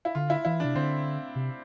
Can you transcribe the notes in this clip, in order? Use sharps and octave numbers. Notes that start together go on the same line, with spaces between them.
E4
D3 F4
E4
E3 E4
C3 D4
D3 C4
C3